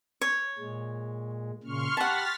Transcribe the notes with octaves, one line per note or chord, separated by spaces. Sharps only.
C#5
A#2 G#3
A#2 C#3 C6 C#6 F6
G4 F#5 A5 B5 F6 A6 B6